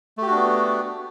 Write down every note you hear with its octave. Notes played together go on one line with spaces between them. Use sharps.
A3 B3 D4 F#4 G4